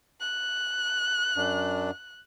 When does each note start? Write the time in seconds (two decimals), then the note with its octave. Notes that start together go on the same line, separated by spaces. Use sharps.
0.21 F#6
1.36 F#2 D4